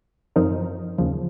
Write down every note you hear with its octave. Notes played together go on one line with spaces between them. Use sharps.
F#2 F3 C4 D#4 A#4
D#2 C#3 F3